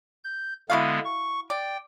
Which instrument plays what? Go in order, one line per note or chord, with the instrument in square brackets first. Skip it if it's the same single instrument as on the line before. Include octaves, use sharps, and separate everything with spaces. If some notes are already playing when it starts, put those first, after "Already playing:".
[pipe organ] G6
[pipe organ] D3 G#3 B3 [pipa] E4 F#4 F5
[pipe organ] C#6
[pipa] D5 [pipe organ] G5